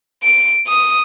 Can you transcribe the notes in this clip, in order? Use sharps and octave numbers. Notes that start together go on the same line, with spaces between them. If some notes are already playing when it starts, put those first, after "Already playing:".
D7
D#6